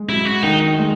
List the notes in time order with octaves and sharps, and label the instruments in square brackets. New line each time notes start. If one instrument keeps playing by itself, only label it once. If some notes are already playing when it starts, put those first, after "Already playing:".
Already playing: [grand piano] G#3
[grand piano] F#3 [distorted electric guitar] E4
[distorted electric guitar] F#4
[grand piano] D#3 [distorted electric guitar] D#4
[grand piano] G#3